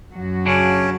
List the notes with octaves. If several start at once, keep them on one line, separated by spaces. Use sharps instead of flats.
F#2 F#3 F#4
C#3 C#4 D4